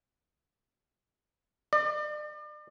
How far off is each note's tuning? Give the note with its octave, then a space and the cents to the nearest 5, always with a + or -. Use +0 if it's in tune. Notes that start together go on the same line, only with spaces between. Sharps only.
D5 +40